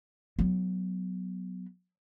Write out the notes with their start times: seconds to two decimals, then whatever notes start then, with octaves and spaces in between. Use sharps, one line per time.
0.39 F#3 B3